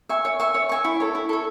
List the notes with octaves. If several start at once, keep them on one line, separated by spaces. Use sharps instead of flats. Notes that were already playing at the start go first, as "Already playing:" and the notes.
E5 G#5 C#6
C#5
E5 G#5 C#6
C#5
E5 G#5 C#6
E4
A4 C#5
E4
A4 C#5